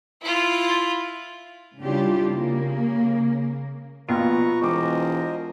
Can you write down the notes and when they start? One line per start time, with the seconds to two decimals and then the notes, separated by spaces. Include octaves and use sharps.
0.21 E4 F4
1.79 C#3 G3 D4 E4 F4 G4
2.25 C#3 A#3
4.08 A#1 B2 F4 B4 A#5 C#6
4.61 E1 A#4 C5 D#5 C#6 D6